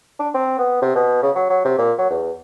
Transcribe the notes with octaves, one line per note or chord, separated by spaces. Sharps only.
D4
C4
B3
C3
B2
C#3
F#3
F#3
C3
A#2
F#3
E2